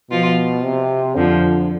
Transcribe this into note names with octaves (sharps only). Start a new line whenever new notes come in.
B2 F3 F4
C3
F2 D3 F3